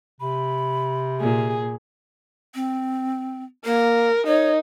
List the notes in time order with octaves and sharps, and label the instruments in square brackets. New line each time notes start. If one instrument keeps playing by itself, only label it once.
[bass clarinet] C3 [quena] B5
[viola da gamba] A#2 [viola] G#4
[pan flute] C4
[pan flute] A#3 [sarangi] A#4
[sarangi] D#4 [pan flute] C#5